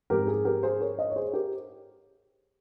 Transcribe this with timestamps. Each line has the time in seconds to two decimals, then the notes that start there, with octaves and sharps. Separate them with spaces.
0.10 G#2 F3 C4 G4 A#4
0.27 G#4
0.45 G4 A#4
0.63 G#4 C5
0.80 A#4 C#5
0.99 C5 D#5
1.10 C#5
1.16 G#4 C5
1.33 G4 A#4